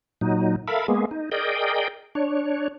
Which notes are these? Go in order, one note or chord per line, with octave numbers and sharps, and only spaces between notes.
A#2 F#3 D#4
A4 A#4 E5 F5 B5
G#3 A#3 B3 G#4
D#4
G#4 A#4 D5 D#5 G5
D4 C#5